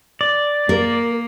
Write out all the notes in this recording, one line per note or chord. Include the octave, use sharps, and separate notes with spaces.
D5
A#3 A#4